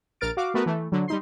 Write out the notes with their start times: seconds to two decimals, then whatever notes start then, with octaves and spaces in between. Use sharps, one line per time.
0.21 A#1 A#4 F6 A6 D7
0.37 F#4 F5 D6
0.54 A3 B3 F#4 A#4 B4
0.66 E3 A3
0.92 D3 F#3
1.08 G3 D#4 C6